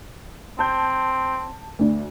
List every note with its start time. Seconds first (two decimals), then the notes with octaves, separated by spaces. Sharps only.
0.59 C4 A5 G6
1.79 D2 D4